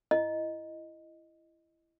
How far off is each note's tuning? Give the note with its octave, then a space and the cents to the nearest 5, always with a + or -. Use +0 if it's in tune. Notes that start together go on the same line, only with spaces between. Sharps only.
E4 +25 D#5 +0